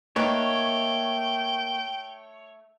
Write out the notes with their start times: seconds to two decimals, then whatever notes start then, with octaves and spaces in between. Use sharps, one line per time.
0.16 D#3 A3 A#3 B4 C#5 G5